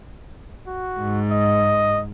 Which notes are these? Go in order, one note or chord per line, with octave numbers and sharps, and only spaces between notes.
F#4
G#2
D#5